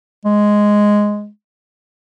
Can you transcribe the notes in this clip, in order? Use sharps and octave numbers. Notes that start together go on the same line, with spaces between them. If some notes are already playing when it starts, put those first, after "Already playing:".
G#3